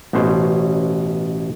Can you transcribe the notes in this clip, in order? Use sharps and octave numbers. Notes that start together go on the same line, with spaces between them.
A1 B2 C#4 C5